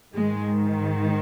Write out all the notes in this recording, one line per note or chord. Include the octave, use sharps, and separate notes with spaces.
G#2 D#3 G#3